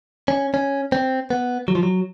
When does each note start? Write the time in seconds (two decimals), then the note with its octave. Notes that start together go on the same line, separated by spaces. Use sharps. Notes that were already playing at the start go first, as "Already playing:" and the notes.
0.28 C#4
0.54 C#4
0.92 C4
1.30 B3
1.68 F#3
1.75 F3
1.83 F#3